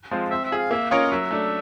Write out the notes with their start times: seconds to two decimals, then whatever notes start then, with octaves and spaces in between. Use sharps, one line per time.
0.11 F3 G#3 C4 F4
0.31 C4 E5
0.45 E5
0.52 F4 G#4
0.57 F5
0.71 A#3 E5
0.91 C#4 F4 A#4 C#5 D#5
1.12 F#3 E5
1.31 A3 D4